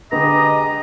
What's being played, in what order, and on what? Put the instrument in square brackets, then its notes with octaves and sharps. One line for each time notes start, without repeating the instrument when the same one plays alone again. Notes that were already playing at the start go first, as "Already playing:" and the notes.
[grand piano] D3 B4 [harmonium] G#3 G4 [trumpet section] D#5 [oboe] A#5